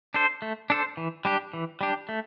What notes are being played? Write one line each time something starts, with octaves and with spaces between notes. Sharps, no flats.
D4 A4 C5
A3
D4 A4 C5
E3
G3 D4 G4
E3
G3 D4 G4
A3